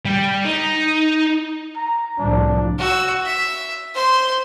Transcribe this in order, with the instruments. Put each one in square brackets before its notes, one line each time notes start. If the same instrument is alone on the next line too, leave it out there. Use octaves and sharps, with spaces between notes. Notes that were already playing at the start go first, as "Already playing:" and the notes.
[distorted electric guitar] G3 G4
D#4
[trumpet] A#5
[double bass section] C2 A2 F3 [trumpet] D4
[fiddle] F#4 E6
E5
C5 C6